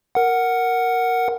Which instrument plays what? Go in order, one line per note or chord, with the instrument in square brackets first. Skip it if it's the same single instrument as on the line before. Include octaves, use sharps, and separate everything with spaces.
[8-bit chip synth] A#4 F#5